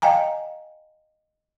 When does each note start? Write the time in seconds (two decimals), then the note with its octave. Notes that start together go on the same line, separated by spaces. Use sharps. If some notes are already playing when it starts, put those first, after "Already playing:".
0.02 D#5 F5 G5 G#5 A#5